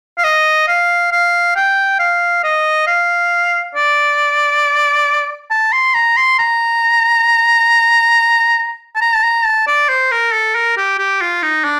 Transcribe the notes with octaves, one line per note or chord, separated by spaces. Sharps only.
F5
D#5
F5
F5
G5
F5
D#5
F5
D5
A5
C6
A#5
C6
A#5
A5
A#5
A5
A#5
A5
D5
C5
A#4
A4
A#4
G4
G4
F4
D#4
D4